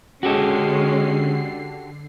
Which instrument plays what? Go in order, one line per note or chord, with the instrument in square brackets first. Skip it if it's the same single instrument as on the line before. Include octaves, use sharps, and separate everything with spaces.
[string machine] D3 C7 [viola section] G#3 C#4 [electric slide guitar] F#4 G4 A4